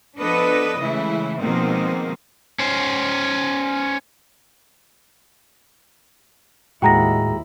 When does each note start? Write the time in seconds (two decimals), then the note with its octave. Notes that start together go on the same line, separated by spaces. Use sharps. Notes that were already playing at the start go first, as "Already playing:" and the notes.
0.19 F3 B3 D4 A4 B4 D#5
0.78 C#3 E3 G#3 A3 E4
1.38 B2 D#3 F3 G#3 A#3 C4
2.59 C#4 C5
6.82 D#2 A2 G#3 E4 F#4 G5 A#5 A#6